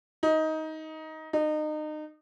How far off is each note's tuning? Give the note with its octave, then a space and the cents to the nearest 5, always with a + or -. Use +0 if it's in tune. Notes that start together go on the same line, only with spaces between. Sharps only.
D#4 +15
D#4 -30